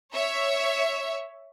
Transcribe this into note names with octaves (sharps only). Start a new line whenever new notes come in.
C#5 E5